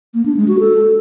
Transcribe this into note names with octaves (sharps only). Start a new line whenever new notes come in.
A#3
D4
G#3
F#4
A4